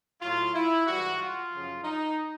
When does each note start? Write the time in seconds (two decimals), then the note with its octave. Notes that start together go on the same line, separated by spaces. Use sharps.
0.21 A2 F#3 F4
0.54 E4
0.86 G#2 E3 G3 F#4
1.19 F4
1.51 F#2 C#3 F3
1.84 D#4